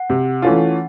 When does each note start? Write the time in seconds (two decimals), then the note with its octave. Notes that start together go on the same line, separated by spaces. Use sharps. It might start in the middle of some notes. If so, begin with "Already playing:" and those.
Already playing: F#5
0.10 C3
0.42 E3 A3 C#4 F4